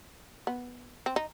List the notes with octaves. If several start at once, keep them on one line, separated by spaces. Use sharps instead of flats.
B3
C4
D#4